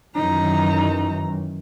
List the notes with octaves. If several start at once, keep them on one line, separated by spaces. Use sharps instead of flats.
F#2 D#3 E3 D#4 A#5